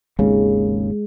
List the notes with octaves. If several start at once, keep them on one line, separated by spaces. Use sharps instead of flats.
G#1 D#2 C#3 G#3